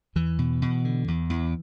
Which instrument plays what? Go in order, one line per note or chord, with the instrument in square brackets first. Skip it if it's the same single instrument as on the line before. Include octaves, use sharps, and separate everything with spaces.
[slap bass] E2 E3
B2
B2
D3
E2
E2